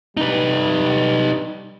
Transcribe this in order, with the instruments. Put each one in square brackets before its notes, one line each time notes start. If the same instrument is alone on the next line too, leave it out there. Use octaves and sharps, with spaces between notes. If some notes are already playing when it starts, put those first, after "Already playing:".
[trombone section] G3 [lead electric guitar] D#4 B4